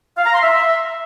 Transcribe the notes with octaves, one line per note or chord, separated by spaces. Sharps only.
F5
A#5
C6
E5